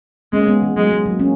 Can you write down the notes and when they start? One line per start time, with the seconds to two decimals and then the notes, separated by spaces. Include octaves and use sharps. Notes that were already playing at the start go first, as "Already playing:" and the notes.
0.33 G#3 A#3 C#4
0.47 G#3 B3
0.62 E3
0.77 F#3 G#3
0.91 G#3
1.06 F#3 A#3
1.19 A#3 C#4